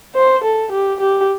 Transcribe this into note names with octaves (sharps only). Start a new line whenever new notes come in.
C5
A4
G4
G4